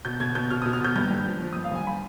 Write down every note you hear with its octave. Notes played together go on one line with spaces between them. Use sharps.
B2 G6
B2 G#6
B2 G6
B2 F6
B2 D#6
F6
B2 G6
G2 G6
G2
F3
F3
G2 D#6
F5
G2 G#5
B5